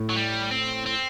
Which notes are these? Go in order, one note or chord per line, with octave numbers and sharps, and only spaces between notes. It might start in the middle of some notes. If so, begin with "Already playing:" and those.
Already playing: A2
F#3
G3
C4
C4